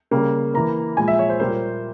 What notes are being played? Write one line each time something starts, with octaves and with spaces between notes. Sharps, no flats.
C#3 G3 A#3
E3 A#3 A#5
A#2 F3 G#3 G#5
E5
C#5
C5
A#2 G3 A#3 C5